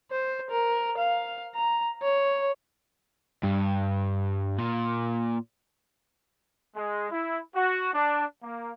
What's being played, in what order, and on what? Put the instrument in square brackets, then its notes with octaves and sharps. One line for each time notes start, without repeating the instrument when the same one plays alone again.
[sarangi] C5
A#4
F5
A#5
C#5
[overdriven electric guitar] G2
A#2
[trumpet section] G#3
E4
F#4
D4
A#3